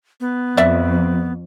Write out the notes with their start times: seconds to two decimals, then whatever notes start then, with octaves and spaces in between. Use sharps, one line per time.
0.20 B3
0.57 F2 D5 E5